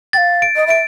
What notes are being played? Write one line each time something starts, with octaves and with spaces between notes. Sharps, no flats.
F5 G5 A6
D7
D#5
E5 D7